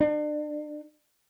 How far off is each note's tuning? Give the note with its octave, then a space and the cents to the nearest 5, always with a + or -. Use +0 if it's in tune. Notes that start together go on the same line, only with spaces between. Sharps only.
D4 +35